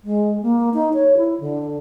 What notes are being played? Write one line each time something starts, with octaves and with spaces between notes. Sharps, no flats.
G#3
A#3
D#4
C#5
E4
D3